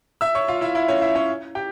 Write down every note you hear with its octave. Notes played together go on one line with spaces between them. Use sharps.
E5 E6
C#5 C#6
F4 F5
E4 E5
E4 E5
C#4 C#5
E4 E5
C#4 C#5
G4 G5